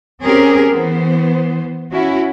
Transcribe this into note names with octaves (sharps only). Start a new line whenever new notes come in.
C4 C#4 G4 G#4 A#4
E3 B3 C5
C#4 E4 F#4